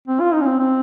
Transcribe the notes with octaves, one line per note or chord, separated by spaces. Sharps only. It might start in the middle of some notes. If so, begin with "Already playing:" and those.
C4
F4
D#4
C#4
C4
C4